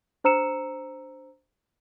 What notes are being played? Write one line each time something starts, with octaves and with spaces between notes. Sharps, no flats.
D4 C5 A#5 E6 C#7 E7